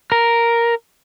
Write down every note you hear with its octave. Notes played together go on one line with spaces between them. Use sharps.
A#4